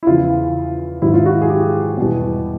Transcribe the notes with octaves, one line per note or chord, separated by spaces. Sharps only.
E4
E2 C#3 F3 F4
G#2 D#3 F#3 E4
F4
F#4
G#4
G4
E2 B2 G3 B3